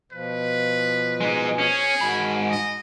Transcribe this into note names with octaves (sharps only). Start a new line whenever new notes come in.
B2 F3 B4
G#3 D#4
C#4 G#4
G#2 F#4 B5
D#5